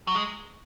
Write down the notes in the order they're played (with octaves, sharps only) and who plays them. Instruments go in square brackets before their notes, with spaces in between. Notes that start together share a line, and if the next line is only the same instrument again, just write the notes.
[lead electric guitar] F#3
G#3